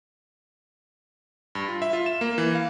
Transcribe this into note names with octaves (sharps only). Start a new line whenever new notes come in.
G2
F4
E5
F4
E7
A#3
E3
F5